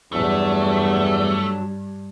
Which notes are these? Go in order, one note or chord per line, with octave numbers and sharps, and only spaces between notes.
E2 G2 F#3 A3 D4